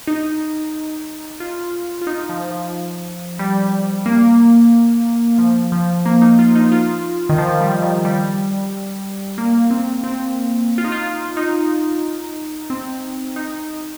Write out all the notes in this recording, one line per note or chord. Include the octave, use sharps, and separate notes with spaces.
D#4
F4
F4
D#4
F3
F3
G3
A#3
F3
F3
A#3
D#4
F4
D#4
F4
D#3
F3
G3
D#3
G3
A#3
C4
C4
F4
D#4
F4
F4
D#4
C4
D#4